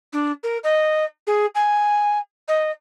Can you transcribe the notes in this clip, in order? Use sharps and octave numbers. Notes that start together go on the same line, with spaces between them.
D4
A#4
D#5
G#4
G#5
D#5